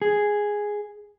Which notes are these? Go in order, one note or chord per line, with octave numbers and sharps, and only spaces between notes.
G#4